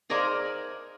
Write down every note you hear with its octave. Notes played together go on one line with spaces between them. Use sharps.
D#4 G#4 A#4 C5 D5 F5